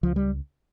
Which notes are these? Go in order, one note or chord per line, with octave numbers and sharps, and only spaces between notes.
C#2 F3
G3